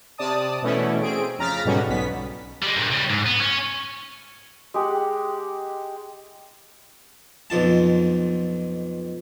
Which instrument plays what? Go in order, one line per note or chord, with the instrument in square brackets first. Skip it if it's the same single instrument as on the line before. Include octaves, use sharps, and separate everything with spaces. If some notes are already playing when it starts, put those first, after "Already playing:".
[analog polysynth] C3 D5 A5 D#6
B2 E3 A3 C#4 E4
C4 G#4 D7
F2 C#3 A#5 F6 A6 B6
G#2 B2 D3 G3 C#4 F#4
B1 B3 B6
[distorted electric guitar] G3 G#3
G2 A#2
C#3 G3
G#2
B3
C#4
[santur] G#3 G4 F#5
[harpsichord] B1 F2 F4 A5